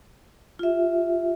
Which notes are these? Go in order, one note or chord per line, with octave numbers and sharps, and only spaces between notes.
F4 G4 E5